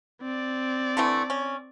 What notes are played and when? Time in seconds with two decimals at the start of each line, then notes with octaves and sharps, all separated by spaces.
0.22 C4 D5
0.97 D3 E3 A3
1.30 C#4